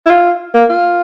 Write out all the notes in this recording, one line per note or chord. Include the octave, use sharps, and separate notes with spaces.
E4
F4
A#3
F4